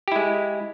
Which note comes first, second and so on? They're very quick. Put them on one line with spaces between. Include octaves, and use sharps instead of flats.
G4 E4 G#3